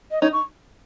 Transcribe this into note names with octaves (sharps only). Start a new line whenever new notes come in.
D#5
D#4 C#5
C#6